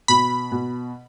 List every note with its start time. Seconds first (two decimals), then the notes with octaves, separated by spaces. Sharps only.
0.08 B2 B5
0.52 B2